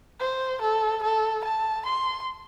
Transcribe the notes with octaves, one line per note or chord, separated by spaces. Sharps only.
C5
A4
A4
A5
C6